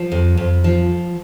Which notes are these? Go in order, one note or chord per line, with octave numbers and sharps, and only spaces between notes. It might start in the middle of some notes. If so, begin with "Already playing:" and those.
Already playing: F3
F2
F2
F3